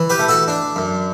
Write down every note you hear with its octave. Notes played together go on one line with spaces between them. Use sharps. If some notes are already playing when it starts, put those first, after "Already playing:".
Already playing: E3
G4 B4
A3
F#4 A4
D4
F#2